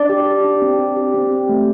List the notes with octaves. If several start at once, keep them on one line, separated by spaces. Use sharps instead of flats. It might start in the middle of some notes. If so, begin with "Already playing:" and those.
Already playing: D4 D5
G4
G4
D4
C4
G4
G4
C4
G4
A3